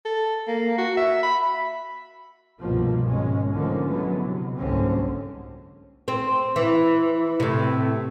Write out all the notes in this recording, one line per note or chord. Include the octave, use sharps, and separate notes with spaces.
A4
A#3
F#4
E5
B5
C2 G2 B2 F3 A#3
G#1 G#3 C#4
D3 D#3 F3 A3 A#3 C#4
D3 E3 F#3 G#3 B3
C3
F#1 C2 G#2 D3 C4 C#4
C4
E3
A2 C3